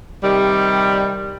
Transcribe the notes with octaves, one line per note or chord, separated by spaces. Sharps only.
C3 D#3 G3